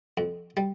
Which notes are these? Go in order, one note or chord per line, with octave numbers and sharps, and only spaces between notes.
F2
G3